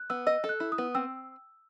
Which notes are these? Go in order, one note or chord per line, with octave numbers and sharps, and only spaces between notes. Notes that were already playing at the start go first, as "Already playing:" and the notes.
Already playing: F#6
B3 E6
D#5 E6
A4
F#6
E4
D#6
B3
C4 E6